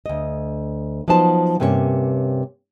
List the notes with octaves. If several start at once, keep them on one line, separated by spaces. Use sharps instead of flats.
D2 D#5
F3 F#3 B3 D#4 C5 A5
G2 C3 A#3 C#4 G4 C#5